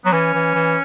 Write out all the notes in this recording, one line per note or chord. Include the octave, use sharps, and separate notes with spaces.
F#3 B3
E3 C#4
E3
E3